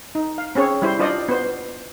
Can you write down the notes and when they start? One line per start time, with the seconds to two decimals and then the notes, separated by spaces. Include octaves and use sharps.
0.15 D#4
0.38 F5
0.55 C4 C#4 G#4 C#5
0.82 G3 E4 C5
0.99 D4 F4 C5 D5 D#5
1.28 B3 C5